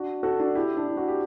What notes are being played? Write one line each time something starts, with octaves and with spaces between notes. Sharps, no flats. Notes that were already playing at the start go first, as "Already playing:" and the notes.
Already playing: D4 F#4
F#4 A4
D4 F#4
E4 G4
D4
E4
F#4
G4